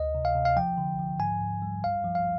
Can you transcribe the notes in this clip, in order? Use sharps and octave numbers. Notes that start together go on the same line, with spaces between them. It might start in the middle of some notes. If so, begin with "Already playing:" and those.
Already playing: D2 D#5
C3
F5
C3
F5
F3 G5
D3
F3
G#2 G#5
G#2
G3
G2 F5
F3
F5